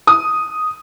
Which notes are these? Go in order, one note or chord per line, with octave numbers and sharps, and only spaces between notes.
D#6